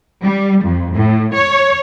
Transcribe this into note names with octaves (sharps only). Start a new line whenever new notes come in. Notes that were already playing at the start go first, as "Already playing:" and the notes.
G3
F2
A2
C#5